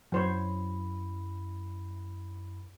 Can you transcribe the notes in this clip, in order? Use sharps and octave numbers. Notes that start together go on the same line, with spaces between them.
F#2 F#3 E4 C5 C#5 B5